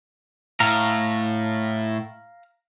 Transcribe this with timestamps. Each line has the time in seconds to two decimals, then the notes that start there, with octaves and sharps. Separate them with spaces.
0.60 A2 F5 A#5